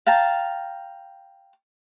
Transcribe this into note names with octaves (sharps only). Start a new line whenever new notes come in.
F5 G5 A5 A#5